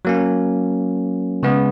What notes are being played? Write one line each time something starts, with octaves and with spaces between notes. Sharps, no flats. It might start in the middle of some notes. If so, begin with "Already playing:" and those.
F#3 A#3 C#4
C#3 G#3 B3